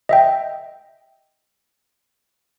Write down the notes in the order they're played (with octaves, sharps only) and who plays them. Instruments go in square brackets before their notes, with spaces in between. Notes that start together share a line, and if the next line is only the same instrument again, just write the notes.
[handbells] D#5 E5 G5